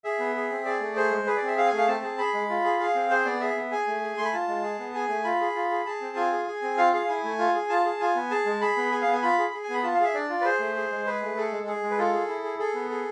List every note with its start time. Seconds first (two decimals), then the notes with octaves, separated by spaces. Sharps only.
0.04 G#4 E5
0.19 B3
0.35 G#4
0.50 C4
0.65 G#4 D5
0.80 A3
0.96 G#4 C5
1.11 G#3
1.26 G#4 B4
1.37 D5
1.42 C4
1.47 E5
1.57 G#4 F5
1.67 G#5
1.72 A3
1.78 F5
1.87 C4 A5
2.03 G#4
2.18 G#4 B5
2.34 G#3
2.49 F4
2.64 G#4
2.79 G#4 F5
2.95 C4
3.10 G#4 C5
3.25 B3 D5
3.40 G#4 E5
3.56 B3
3.71 G#4 G#5
3.87 A3
4.02 G#4
4.17 A3 C6
4.25 B5
4.32 F4 A5
4.48 G#3
4.63 G#4
4.79 B3
4.94 G#4 G#5
5.09 A3
5.24 F4 B5
5.40 G#4
5.55 F4
5.71 G#4
5.86 G#4 A5
6.01 C4
6.16 F4 G#5
6.32 G#4
6.47 G#4
6.62 C4
6.77 F4 F5
6.93 G#4 F5
7.08 E4 G#5
7.24 A3
7.39 F4
7.54 G#4
7.69 F4 A5
7.85 G#4
8.01 F4 G#5
8.15 B3
8.31 G#4 A5
8.46 G#3
8.61 G#4 B5
8.77 B3
8.92 G#4 G#5
9.02 F5
9.07 B3
9.12 G#5
9.22 F4 B5
9.38 G#4
9.53 G#4
9.63 G#5
9.69 B3 B5
9.83 F4 A5
9.94 F5
9.99 G#4 E5
10.14 D4 D5
10.29 F4
10.41 B4
10.44 G#4 C5
10.60 A3
10.75 G#4
10.91 G#3
11.06 G#4 B4
11.22 A3
11.36 G#4 A4
11.52 G#3
11.67 G#4
11.83 G#3
11.90 B4
11.98 F4 A4
12.13 G#4
12.28 E4
12.44 G#4
12.59 G#4 A4
12.74 B3
12.90 G#4